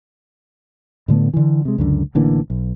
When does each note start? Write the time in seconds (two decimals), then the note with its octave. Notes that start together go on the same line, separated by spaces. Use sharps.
1.08 A2 D3 A3 B3
1.34 D3 E3
1.65 C3 G#3
1.78 C#2 F#2 D3
2.15 A1 D3 E3 A#3
2.50 B1